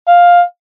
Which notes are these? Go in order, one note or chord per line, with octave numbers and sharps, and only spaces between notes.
F5